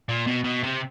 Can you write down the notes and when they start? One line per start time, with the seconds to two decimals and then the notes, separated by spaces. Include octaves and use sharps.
0.09 A#2
0.27 B2
0.44 B2
0.63 C3